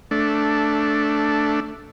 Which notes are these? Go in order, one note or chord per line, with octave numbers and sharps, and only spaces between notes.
A3 D4